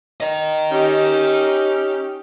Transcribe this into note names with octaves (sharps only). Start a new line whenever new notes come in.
A#4 D#5
C#4 D#4 G4